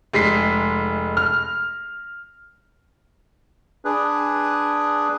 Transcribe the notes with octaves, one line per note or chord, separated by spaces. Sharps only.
F1 G#3 B6 C7
F6
D4 G#4 B4